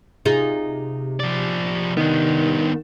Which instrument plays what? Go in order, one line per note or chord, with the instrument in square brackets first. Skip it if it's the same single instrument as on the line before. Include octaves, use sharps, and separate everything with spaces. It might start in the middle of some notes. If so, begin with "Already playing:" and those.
[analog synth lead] C3 [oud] D#4 F4 G#4
[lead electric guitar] F3 D5
[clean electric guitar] D#3 [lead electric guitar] B3 D4